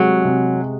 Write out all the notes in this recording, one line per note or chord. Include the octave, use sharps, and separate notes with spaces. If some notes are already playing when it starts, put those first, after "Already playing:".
Already playing: C3 F#3 G#3
C3